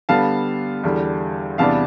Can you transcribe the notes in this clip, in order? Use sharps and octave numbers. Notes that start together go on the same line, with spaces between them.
D3 G3 B3 F5 A5
E2 D3 G3
E2 C3 G3 B3 D4 F5 A5